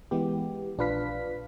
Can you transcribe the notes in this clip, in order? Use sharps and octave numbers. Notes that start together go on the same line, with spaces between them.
E3 G#3 B3 G4
A#1 D4 F4 B4 F5 B6